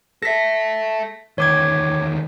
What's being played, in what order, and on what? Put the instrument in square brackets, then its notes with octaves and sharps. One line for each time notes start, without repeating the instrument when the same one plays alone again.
[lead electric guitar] A4 E5 [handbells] A#6 B6
[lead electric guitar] D2 D#3 [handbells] C#5 D6 G#6